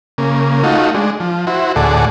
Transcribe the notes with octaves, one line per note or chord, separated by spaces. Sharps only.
C#3 A#3
A3 D#4 F4 F#4
G#3 D4
F3
E4 F#4 C5
D2 A2 G#4 A4 D5 F#5